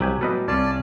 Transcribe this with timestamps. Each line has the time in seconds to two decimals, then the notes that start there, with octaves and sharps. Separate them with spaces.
0.01 C2 F#3 G4 G#5
0.21 A2 E3 F#3 G3 B3 A4 B4 D#5
0.48 C2 C#4 F4 D5 A5